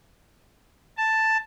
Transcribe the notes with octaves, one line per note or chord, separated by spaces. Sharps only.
A5